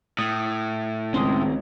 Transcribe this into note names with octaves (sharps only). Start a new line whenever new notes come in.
A2 D#6
C#2 D#3 C4 C#4 C6 D#6